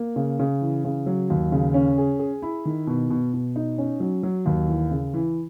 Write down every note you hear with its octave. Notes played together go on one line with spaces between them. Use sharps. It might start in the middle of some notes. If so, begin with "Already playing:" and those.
Already playing: A#3
C#3
C#3
E3
C#3
F#3
D#2
C#3
C#4
G#4
G#4
E4
D#3
B2
B2
B2
D#4
C#4
F#3
F#3
D#2
E3
C#3
E3